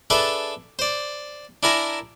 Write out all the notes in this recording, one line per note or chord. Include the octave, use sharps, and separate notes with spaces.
D4 G#4 A4 B4 E5
C5 D5
D4 E4 A#4 G#5 A#5